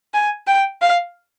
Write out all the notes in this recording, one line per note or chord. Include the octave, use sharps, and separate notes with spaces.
G#5
G5
F5